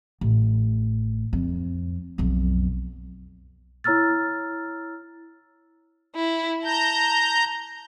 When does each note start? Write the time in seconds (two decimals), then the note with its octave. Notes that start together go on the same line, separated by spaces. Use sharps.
0.21 A1
1.33 F2
2.18 B1 F2
3.84 E4 C#5 A#5 E6 F6 A6
6.15 E4
6.65 A5 A#5 G6